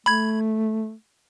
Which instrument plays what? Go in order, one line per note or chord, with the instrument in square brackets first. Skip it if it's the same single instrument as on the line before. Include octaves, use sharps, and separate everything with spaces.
[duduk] A3 [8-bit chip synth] B5 G#6